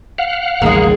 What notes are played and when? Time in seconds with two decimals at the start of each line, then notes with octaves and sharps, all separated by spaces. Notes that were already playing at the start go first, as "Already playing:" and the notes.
0.18 F5 F#5
0.62 A1 D#2 C#3 G3 G#3 A#3 G#4